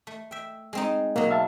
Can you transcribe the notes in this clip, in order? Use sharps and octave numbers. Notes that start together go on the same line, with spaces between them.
A3
E5 G5
G#3 C4 D#4
B2 F#3 A#3 D#5
E5 F5 A5